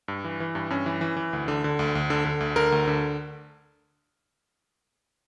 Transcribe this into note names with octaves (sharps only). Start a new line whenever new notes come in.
G2
E3
E3
G2
G2 C#4
E3
E3
E3
D2
D3
D3
D2
D2
D3
D3
D2
D3 A#4
D2
D3